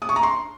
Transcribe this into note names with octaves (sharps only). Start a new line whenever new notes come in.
D#6
C#6
A#5
C6